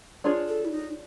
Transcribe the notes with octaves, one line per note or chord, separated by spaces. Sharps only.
D4 F4 G#4 C#5
A4
E4
D#4